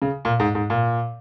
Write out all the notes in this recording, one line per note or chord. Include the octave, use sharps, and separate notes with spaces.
C#3
A#2
G#2
G#2
A#2